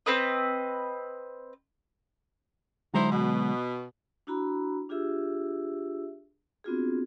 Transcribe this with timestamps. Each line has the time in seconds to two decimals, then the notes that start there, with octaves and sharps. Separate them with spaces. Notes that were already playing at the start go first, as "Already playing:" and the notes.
0.06 C4 B4 D#5
2.94 D3 F#3 G#3 D#4 E4 C5
3.10 B2
4.27 D4 E4 F#4 A#5 B5
4.89 D4 F4 G4 G#4 E5 E6
6.64 B3 C4 D4 F4 F#4 G#4